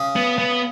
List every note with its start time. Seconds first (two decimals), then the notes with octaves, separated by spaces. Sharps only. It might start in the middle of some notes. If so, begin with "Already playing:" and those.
Already playing: C#3
0.16 B3
0.38 B3